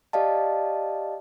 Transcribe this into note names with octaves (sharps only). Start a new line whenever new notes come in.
G4 D5 D#5 F5 A5